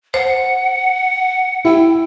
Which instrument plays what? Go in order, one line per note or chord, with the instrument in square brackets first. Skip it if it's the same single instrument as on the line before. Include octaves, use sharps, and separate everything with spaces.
[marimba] C5 [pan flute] F#5
[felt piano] E4 [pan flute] G5